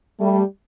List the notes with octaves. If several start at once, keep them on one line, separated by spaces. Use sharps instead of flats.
G3 A3